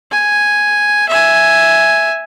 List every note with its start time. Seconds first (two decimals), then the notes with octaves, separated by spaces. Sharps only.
0.12 G#5
1.09 E5 G#5